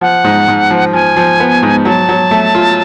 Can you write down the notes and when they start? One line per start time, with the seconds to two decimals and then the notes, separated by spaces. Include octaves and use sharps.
0.01 F3 F#5
0.24 G#2
0.48 G#2
0.71 F3
0.93 F3 G#5
1.17 F3
1.40 B3
1.63 G#2
1.85 F#3 A5
2.09 F#3
2.31 A3
2.55 F4